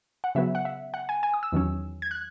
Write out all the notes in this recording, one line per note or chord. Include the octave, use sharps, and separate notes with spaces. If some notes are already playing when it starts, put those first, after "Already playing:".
F#5
C#3 F#3 B3 E5
F#5
E5
F#5
G#5
G#5
D#6
E6
E2 D#3 F#3 C#4
G#6
F#6